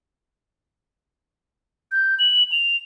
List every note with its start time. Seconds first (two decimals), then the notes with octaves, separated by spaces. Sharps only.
1.92 G6
2.19 F#7
2.52 F7